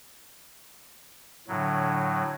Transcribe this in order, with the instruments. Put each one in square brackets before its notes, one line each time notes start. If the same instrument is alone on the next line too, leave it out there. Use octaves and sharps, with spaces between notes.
[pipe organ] A2 F#3 [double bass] D3